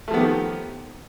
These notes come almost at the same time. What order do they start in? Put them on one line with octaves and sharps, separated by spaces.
A3 F3 B3 D#3 G4